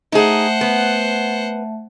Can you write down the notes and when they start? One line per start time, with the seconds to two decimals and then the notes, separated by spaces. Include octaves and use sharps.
0.12 A3 D#4 G#4 C5 E5 F#5 A5
0.61 B3